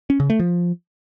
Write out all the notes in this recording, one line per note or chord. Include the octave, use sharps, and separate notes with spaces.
C#4
C#3
A3
F3